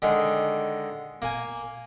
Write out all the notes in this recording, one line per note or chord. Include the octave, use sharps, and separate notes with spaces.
D3 D#3 G#3
A#3 G#5